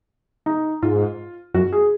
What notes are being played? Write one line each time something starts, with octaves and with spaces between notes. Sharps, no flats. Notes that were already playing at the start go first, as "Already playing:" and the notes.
D#4
G#2 F4
F#2 F#4
G#4